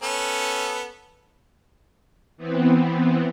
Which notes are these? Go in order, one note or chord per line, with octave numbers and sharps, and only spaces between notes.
B3 C#4 A4
E3 B3 C4